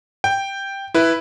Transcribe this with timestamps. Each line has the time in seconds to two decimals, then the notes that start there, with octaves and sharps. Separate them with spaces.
0.24 G5
0.94 E4 B4